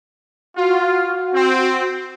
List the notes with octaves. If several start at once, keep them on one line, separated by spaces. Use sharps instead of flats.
F4 F#4
C4